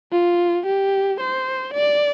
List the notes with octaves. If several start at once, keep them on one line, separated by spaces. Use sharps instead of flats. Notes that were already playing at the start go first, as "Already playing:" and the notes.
F4
G4
C5
D5